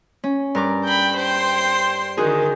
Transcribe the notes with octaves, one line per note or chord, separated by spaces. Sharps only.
C#4
G2 A#4 D6
G5 B5
C5 G5 C6
D3 D#3 F#4 G#4